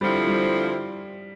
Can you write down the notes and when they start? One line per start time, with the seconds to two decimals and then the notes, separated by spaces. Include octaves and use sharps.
0.01 D3 F3 G3 C4 E4
0.27 G3